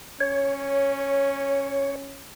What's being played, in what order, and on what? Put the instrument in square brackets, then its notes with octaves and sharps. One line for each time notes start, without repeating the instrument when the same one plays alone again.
[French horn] C#4 [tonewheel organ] C#5